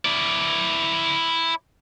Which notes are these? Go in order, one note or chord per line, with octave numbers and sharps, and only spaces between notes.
E4 D5